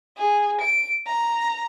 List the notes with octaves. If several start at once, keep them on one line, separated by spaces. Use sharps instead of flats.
G#4
D7
A#5